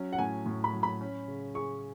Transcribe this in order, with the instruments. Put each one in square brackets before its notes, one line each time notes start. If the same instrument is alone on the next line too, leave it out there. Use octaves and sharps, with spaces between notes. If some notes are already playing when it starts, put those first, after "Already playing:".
Already playing: [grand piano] F#3 C#4
[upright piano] F#5
[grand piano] A2 [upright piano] G#5
[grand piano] A2
[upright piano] B5
[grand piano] F#3
[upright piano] B5
[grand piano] C#4
C#3
[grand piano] G#4 [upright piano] C#6